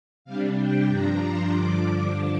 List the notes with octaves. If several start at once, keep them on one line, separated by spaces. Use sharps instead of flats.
C3 G3 D4 F5
G5
G2 F3 D4 A#5
C6
G2 D3 F3 D4 D6